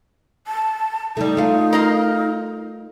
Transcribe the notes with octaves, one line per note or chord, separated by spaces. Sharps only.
A5
G3 A3 D#4
A3 F4
A#4 D#5 F5